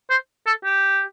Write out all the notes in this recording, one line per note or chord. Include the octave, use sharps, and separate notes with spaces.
C5
A4
G4